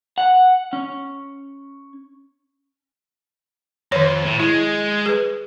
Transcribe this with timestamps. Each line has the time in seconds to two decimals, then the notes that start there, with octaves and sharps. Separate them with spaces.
0.18 F#5
0.73 C#4
3.92 F2 D#3 C#5
4.25 A2
4.40 G#3 E4
5.06 G#4 B4